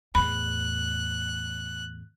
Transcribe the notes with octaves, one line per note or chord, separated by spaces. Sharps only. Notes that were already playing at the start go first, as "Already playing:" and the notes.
E2 A2 B5 F#6